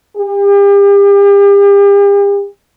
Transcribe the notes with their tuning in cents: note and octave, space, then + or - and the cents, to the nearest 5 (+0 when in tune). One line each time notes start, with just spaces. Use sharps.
G4 +40